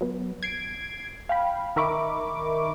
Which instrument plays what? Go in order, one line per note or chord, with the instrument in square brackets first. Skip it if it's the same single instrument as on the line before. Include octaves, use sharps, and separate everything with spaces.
[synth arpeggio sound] F#3 B3
G#6 C7 D7
F5 G5 B5
D#3 A#4 E5 B5 C#6 D6